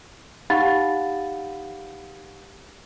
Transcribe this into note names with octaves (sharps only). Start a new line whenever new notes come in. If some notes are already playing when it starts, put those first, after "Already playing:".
D#4 G4 F5 F#5 B5 A6